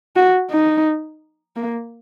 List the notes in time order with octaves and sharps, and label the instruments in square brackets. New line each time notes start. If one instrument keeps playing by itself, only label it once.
[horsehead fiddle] F#4
D#4
A#3